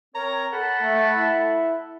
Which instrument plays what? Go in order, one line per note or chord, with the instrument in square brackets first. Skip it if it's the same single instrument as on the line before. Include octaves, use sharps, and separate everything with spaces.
[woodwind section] C4 A#4 C#5 [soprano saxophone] A#5
[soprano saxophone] A4 [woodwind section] F#5 A5 B5
[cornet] A3
E4